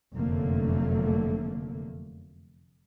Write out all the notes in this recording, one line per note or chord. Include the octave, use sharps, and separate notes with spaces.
F1 F#2 D3 F#3 A3 A#3